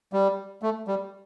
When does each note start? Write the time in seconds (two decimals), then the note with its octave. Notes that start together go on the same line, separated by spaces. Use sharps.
0.13 G3
0.62 A3
0.88 G3